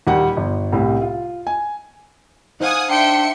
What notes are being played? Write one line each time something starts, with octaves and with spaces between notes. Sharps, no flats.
D#2 A#2 G3 F#5
G1
C2 A2
F4
G#5
D#4 C5 F5 F#5 G#5 D#6
D4 E5 G5 C6 C#7